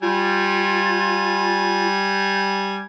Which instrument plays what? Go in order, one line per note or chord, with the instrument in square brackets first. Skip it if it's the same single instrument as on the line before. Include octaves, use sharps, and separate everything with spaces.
[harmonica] G3 G#5 [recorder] F4